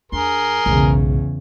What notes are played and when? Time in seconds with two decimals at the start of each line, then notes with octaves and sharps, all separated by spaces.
0.12 E2 D4 G#4 A#4 C6
0.66 B1 E2 G#2 C#3